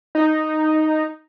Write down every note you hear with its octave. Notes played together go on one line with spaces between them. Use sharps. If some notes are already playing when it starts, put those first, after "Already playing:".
D#4